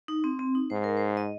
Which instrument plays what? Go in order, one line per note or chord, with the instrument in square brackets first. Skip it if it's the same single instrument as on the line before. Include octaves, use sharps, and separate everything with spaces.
[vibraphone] D#4
C4
C4
D#4
[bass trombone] G#2 [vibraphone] C5
[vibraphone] A#4
C5
D#5